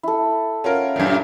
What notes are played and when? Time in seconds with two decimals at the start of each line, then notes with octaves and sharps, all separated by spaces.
0.03 E4 A4
0.64 C#4 F4 A#4 F#5
0.96 F#2 A#2